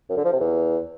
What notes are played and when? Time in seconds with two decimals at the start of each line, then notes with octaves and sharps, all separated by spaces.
0.09 F#2
0.17 D3
0.25 F3
0.32 C3
0.40 E2